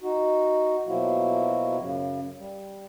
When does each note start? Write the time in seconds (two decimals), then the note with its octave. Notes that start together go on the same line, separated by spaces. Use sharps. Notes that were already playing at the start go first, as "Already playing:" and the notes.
0.01 D#4 F#4
0.87 B2 F3 F#3 A#3 E4 F#4
1.78 F#2 C#3
2.38 G3